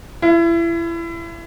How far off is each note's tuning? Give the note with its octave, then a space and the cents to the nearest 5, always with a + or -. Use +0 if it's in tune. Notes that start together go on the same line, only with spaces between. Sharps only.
E4 +30